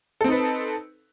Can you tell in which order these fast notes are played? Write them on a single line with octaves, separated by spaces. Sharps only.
A4 C4 D#4 B4